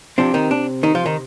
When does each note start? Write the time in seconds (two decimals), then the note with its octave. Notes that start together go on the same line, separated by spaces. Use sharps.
0.18 C3 F3 C4 D4
0.34 D#3 D#4
0.51 D4
0.83 D#3 D#4
0.95 F3 F4
1.06 D#3 D#4